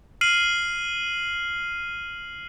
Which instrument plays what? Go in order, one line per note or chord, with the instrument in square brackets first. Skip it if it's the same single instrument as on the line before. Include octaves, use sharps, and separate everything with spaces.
[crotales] F6 C7 D#7 F#7